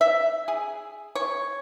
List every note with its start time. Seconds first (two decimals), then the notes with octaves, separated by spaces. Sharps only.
0.01 E5
0.48 G#4
1.15 C#5